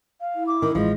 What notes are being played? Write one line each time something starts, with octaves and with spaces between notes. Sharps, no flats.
F5
E4
D6
D#3
A1 F3 G#3 D#5